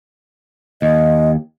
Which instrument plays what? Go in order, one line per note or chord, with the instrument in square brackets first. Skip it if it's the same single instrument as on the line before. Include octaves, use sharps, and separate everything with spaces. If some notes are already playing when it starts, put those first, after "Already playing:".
[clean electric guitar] D#2 [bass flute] D#5